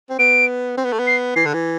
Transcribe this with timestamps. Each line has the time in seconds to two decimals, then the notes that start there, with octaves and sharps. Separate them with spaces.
0.10 C4
0.19 B3 D7
0.77 C4
0.85 B3
0.92 A3
0.99 B3
1.07 C7
1.36 E3 C7
1.45 D3
1.54 E3